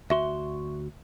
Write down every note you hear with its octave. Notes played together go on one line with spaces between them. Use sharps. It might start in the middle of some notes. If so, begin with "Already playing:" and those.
D2 F#4 E5 C6